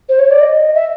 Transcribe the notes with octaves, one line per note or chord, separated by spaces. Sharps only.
C5
C#5
D5
D#5
E5